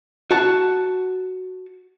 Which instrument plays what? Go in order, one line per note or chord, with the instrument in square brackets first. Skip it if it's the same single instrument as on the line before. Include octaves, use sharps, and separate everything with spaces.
[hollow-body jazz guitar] F#4 A5